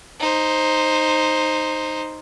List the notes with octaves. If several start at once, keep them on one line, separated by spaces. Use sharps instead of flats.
D#4 C5